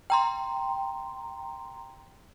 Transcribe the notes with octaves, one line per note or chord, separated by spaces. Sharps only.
G5 A#5 C6